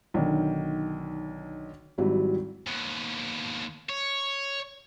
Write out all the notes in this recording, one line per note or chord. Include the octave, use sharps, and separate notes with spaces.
B1 D3 D#3
G#1 F#3 G3 E4
D#2 B2
C#5